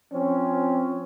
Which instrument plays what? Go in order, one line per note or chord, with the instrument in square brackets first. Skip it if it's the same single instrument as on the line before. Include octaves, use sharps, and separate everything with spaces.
[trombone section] F3 C4 C#4